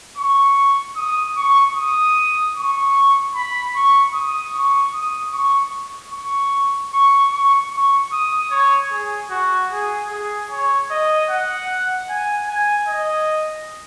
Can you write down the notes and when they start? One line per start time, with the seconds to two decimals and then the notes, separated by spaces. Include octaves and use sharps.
0.17 C#6
0.96 D#6
1.36 C#6
1.76 D#6
2.56 C#6
3.34 B5
3.75 C#6
4.14 D#6
4.53 C#6
4.93 D#6
5.33 C#6
6.12 C#6
6.92 C#6
7.32 C#6
7.72 C#6
8.12 D#6
8.51 C#5
8.92 G#4
9.30 F#4
9.71 G#4
10.10 G#4
10.50 C#5
10.90 D#5
11.30 F#5
12.09 G#5
12.48 G#5
12.88 D#5